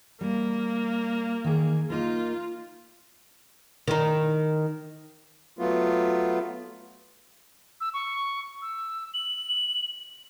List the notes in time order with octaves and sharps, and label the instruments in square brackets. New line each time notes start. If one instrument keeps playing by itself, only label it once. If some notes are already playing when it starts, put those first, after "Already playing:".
[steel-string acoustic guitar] G3 [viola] A#3
[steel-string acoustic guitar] D#3 G#4
[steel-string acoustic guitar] A#3 D#4 A#4 [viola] F4
[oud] D#3 D#4
[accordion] F#3 A3 B3 F4
[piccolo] E6
C#6
E6
F#7